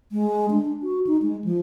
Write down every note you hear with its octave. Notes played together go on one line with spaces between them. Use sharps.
G#3
D4
F#4
D#4
G#3
F3